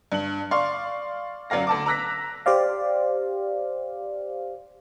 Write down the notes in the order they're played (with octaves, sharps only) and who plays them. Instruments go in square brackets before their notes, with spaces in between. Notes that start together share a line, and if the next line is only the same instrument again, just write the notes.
[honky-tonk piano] G2 F#7
D5 F5 C6 C#6
F#2 F#3 D5 F5 A#6
D2 A5 D6
A#5 D6 E6 F#6 A#6 B6
[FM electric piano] G4 C5 D5 F5